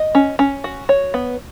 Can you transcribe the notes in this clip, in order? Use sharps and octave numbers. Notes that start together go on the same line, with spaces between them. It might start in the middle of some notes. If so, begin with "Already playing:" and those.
Already playing: D#5
C#4
C#4
F#4
C#5
B3